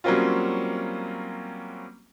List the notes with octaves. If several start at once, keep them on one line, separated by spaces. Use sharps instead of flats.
F#3 G3 A#3 C4 C#4 F4